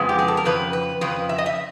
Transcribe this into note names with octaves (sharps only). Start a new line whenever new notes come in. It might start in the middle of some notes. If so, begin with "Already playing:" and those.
Already playing: F2 C#3 G#3 B3
G4
G#4
A4
A#4
F2 C#3 B4
B4
F2 C#3 B4
E5
D#5
E5